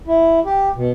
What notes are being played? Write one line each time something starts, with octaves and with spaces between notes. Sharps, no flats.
E4
G4
B2